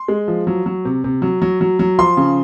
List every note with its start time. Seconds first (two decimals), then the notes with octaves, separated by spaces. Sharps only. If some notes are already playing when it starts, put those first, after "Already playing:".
Already playing: C6
0.08 G#3
0.28 F3
0.47 F#3
0.66 F#3
0.85 C3
1.04 C3
1.22 F#3
1.42 F#3
1.61 F#3
1.79 F#3
1.98 F3 C6
2.17 C#3